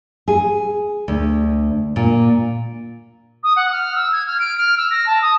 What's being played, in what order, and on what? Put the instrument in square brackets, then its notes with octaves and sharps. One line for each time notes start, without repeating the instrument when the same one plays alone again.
[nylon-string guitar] G#4
D2
A#2
[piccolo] D#6
F#5
F6
E6
G#6
F6
D7
F6
E6
A#6
A5
D#6